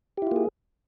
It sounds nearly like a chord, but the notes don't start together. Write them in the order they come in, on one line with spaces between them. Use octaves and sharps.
G4 E4 F4 A#3 G#4